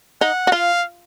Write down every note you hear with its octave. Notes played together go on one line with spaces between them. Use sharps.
D#4 F#5
F#4
F4 F5